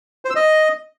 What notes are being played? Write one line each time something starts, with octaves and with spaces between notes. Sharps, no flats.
C5
E6
D#5